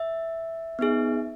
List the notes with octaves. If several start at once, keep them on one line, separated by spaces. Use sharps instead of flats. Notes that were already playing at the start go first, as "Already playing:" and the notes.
Already playing: E5
B3 D#4 G#4